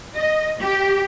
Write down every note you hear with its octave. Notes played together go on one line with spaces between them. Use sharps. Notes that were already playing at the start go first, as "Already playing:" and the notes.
D#5
G4